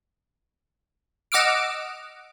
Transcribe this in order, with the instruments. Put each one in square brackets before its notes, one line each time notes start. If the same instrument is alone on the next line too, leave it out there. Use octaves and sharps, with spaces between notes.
[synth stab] D#5 F#5 D6 E6 F6 D7